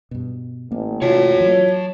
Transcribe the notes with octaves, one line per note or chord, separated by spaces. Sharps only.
G2 B2
A1 A#3
C3 F4 F#4 C#5 A5
E3 F#3